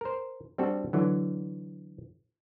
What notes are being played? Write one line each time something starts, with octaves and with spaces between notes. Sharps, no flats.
A#4 C5
G3 C4 D4 F#4 A4
D3 E3 F#3